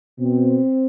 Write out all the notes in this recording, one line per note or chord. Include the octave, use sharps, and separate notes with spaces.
B2 C4